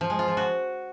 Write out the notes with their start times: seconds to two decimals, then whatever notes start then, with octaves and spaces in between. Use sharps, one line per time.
0.01 F3
0.10 G#3
0.19 F4
0.28 F3
0.37 F#4